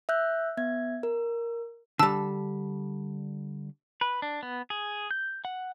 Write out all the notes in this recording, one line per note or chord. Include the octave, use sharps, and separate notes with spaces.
E5 E6 F#6 G6
B3 E5 G#6
A#4
D3 G3 A5 E6
B4
D4
B3
G#4
G6
F#5